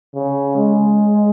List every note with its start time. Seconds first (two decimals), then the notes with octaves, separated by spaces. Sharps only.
0.15 C#3
0.57 G#3